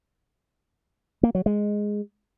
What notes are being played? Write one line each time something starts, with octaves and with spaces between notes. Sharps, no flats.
A#3
F#3
G#3